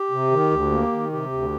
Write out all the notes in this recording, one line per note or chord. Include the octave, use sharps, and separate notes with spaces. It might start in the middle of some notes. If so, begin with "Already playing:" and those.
Already playing: G4
C3
D#3
D2
A#3
D#3
C3 G4
D2